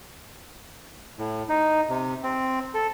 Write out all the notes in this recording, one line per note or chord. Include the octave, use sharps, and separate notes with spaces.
A2
D#4
C3
C4
A4